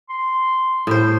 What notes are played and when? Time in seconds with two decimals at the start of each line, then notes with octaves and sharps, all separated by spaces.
0.09 C6
0.87 A2 C5